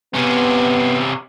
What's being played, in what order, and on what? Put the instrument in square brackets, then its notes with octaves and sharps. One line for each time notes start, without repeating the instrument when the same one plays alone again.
[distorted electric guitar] C3 C#4 [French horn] B3